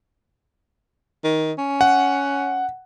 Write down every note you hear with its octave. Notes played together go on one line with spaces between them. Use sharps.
D#3
C#4
F#5